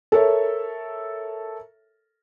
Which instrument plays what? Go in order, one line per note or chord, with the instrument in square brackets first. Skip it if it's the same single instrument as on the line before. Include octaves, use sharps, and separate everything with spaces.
[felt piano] A4 A#4 C#5 E5